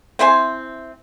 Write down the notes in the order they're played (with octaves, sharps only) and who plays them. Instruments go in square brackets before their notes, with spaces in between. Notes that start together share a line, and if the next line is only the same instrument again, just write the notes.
[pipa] C4 E4 C5 G#5